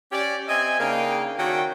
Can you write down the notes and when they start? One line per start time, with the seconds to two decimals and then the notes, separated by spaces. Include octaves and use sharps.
0.12 C#4 G4 D5
0.48 C4 D#5 E5 G#5
0.79 C#3 A#3 D4 D#4 F5 G5
1.38 D#3 C#4 F#4 A4 D5 G5